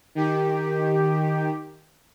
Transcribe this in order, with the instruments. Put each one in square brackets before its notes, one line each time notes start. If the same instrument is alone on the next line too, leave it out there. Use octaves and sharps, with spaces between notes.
[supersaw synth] D#3 G4